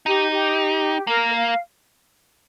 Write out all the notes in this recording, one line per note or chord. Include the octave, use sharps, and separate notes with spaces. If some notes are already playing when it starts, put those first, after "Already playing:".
D#4 G4
G4
A#3 A#4
F5